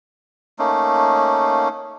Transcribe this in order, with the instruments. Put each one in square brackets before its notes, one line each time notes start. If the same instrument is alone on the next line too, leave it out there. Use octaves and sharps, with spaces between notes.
[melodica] A3 A#3 C#4 D#4